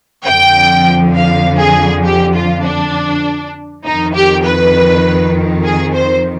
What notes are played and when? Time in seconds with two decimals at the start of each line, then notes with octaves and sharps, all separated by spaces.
0.25 F2 D3 F3 G5
1.14 F5
1.60 G#4
2.05 G4
2.35 F4
2.64 D4
3.84 F2 D#3 D#4
4.14 G4
4.44 B4
5.64 G#4
5.95 C5